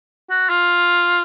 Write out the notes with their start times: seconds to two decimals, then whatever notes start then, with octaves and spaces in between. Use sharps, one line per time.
0.30 F#4
0.49 F4